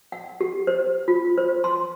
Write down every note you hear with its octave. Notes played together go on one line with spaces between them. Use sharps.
F#5
G4
C5
F4
C5
C6